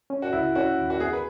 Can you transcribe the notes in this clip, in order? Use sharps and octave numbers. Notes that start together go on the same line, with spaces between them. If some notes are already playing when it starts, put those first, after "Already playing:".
C#4
F#4
C#2 E4
C#4 F#4
D#2
F#4
B3 G#4
B4